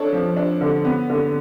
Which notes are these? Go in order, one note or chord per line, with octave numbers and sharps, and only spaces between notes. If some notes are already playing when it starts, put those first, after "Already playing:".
Already playing: D4 A4 C#5
F3
D4
D3
B3
D3